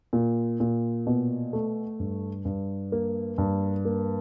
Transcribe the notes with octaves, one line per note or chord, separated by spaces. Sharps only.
A#2
A#2
B2
A3
G2
G2
A#3
G2
A#3